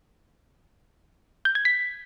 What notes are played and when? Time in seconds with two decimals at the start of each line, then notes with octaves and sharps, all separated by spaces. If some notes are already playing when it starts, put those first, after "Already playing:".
1.45 G6
1.55 G#6
1.65 B6